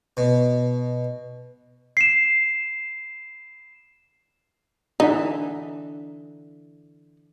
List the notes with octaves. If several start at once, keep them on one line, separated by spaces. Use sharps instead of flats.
B2
C7 E7
D3 E3 D#4 E5